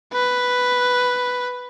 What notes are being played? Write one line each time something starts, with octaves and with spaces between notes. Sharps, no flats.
B4